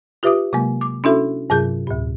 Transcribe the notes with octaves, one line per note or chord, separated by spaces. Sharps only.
F4 G4 B4 E5 D6 D#6
C3 F#3 G#3 A#3
D6
C#4 D4 E4 F#4 A4 E5
G2 C3 F#3 G#4 G6
D2 A2